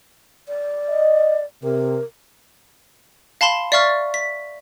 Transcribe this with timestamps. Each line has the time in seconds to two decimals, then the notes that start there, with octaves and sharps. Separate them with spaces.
0.48 D5
0.89 D#5
1.63 C3 A#4
3.41 F5 A5 B5 C6 E7
3.72 D5 E5 F5 C#6 F6 A6
4.14 B6